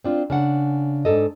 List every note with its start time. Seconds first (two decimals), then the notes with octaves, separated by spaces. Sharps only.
0.04 C4 D4 F4
0.30 C#3 D4 F#5
1.05 G#2 D4 A4 D#5